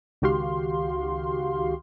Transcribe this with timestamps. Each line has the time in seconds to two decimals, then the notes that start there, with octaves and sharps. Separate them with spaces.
0.22 C#2 D#3 F#4 G4 F5 C6